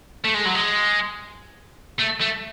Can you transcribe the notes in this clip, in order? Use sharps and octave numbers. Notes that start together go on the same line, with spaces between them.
A3
G#3
F#3
G#3
A3
A3